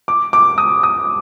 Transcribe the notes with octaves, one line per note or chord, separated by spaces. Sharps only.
D6
D6
D#6
D#6